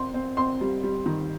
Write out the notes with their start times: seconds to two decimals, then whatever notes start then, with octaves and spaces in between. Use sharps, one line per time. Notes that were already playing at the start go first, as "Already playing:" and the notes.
Already playing: C4 C6
0.14 C4
0.37 C4 C6
0.61 G3
0.83 G3
1.06 D#3